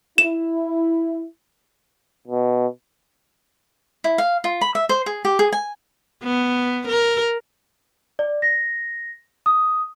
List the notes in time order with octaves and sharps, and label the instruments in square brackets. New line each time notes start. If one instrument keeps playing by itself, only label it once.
[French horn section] E4 [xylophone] E7
[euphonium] B2
[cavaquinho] E4
F5
F4
B5
E5
C5
G#4
G4
G#4
G#5
[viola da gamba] B3
A#4
[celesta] D5
A#6
D#6